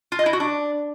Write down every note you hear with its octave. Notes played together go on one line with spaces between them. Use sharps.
F4
D#5
E4
F#4
D4